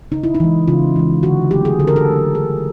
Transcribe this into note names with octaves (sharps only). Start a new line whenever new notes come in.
C#3 D#4
E4
D#4
E3 G#3
C#3 F4
E3 G#3
D3 F#4
F#3 A3 G4
G#4
D3 A4
A#4
A4
F#3 A3
D3 G#4